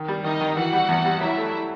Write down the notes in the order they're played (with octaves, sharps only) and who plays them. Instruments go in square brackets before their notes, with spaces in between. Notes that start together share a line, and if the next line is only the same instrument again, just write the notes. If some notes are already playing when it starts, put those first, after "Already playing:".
Already playing: [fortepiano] D#3
G3
[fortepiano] D#3 [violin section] D#4 D#5
[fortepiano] D#3
[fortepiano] E3 [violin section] F#4 F#5
[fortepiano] G3
E2
G3
[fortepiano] F#3 [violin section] E4 E5
[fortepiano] A3